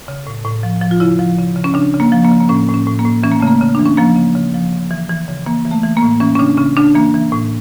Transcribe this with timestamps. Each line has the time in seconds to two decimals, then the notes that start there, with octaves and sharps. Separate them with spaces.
0.08 C#3
0.27 A2
0.45 A2
0.63 F3
0.82 F3
0.91 F4
1.00 C#3 E4
1.19 F3
1.38 C#3
1.56 C#3
1.64 C#4
1.74 C#3 D4
1.94 C#3
2.00 A#3
2.12 F3
2.24 A#3
2.31 C#3
2.40 A#3
2.49 A2 C#4
2.68 A2
2.74 C#4
2.86 A2
2.99 A#3
3.05 A2
3.23 E3 C#4
3.32 A#3
3.40 C#3 A3
3.47 A#3
3.61 C#3
3.75 E3 D4
3.86 C#4
3.97 F3 A#3
4.16 C#3
4.35 C#3
4.54 F3
4.72 C#3
4.91 E3
5.09 E3
5.28 C#3
5.46 E3 A#3
5.65 E3
5.71 A3
5.83 E3
5.97 A#3
6.02 A2
6.20 E3 C#4
6.36 C#4
6.39 C#3 D4
6.57 C#3 C#4
6.77 C#3 D4
6.95 E3 A#3
7.14 E3
7.32 A2